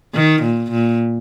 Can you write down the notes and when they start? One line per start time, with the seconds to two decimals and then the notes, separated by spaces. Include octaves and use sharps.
0.14 D#3
0.43 A#2
0.71 A#2